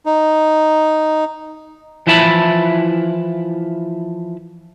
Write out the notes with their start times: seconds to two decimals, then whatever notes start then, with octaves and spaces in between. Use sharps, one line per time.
0.06 D#4
2.07 E3 F3 E4 E5 A5 B5